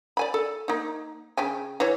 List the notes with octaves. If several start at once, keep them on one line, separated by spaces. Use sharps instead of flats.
D5 G#5 B5
A4
A#3 D#4
C#3 G5 G#5
E3 C#5